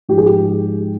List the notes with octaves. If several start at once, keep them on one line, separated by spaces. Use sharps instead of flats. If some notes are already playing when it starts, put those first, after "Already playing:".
G#2 F3 G#3 G4
G#4
G4